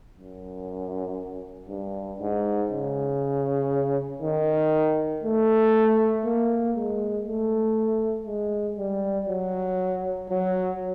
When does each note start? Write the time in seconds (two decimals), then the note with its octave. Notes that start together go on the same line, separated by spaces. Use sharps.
0.17 F#2
1.69 G2
2.20 G#2
2.70 C#3
4.22 D#3
5.23 A3
6.25 A#3
6.76 G#3
7.26 A3
8.27 G#3
8.78 G3
9.29 F#3
10.30 F#3